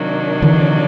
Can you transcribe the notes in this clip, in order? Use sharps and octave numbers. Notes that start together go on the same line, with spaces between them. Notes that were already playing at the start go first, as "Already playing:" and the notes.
Already playing: C3 D#3 F#3 A#3 D4
D3 E3